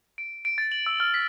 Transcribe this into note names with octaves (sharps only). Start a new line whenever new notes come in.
D7
D7
A6
F#7
E6
F6
B6